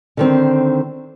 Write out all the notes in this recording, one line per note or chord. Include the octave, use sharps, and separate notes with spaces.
D3 D#3 C4